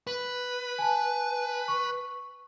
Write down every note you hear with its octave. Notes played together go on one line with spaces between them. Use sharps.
B4
G#5 A5
C#6